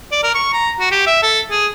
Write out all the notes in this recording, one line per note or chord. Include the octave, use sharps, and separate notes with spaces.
D5
A#4
C#6
A#5
F#4
G4
E5
A4
G#4